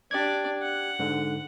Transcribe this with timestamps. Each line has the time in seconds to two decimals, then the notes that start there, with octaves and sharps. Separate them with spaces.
0.11 D4 G4 D5 G#6
0.62 F#5
0.99 G#2 D3